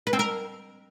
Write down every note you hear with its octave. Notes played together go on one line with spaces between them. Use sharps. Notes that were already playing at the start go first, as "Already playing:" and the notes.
B4
C4
A#4